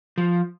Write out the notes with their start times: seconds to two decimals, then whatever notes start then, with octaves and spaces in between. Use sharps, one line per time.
0.18 F3